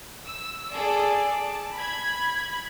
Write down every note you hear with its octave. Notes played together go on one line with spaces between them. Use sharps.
E6
G#4 A4 D5
A5
B5 G#6